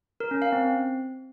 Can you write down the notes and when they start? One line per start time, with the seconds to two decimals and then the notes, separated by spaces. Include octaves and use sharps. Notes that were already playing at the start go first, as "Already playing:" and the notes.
0.20 A#4
0.31 C#4
0.42 F5
0.52 C4